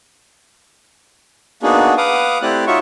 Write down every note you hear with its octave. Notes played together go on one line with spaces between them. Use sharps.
A#3 B3 D4 D#4 F#4 G#4
B4 F5 F#5 D6 D#6
A3 C4 E4 G4 D5 F#6
D#4 F4 F#4 C#5 E5 C#6